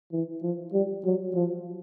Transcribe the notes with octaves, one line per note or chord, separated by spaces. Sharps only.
E3
F3
G3
F#3
F3